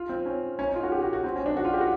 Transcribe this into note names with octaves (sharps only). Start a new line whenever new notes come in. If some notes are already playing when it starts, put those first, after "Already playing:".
Already playing: F4
C4
C#4
C#4
D#4
F4
F#4
G4
F#4
F#4
C4
C#4
D4
F#4
F4
G4
F#4